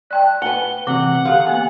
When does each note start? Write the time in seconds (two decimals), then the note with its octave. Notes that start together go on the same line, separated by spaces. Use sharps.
0.10 D5 G5 A5 F#6
0.42 B4 F#5 G#5 G7
0.87 C3 E3 F#5
1.25 D3 G4 A4 F5
1.47 A#3 B3 G#5